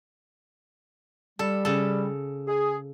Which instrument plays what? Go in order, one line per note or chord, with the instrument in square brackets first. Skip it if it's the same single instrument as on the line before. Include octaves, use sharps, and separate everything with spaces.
[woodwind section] G3 [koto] A4
[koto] C#3 A4
[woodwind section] G#4